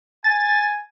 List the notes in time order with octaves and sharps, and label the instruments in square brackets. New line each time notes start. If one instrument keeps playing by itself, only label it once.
[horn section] G#5 [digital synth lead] A6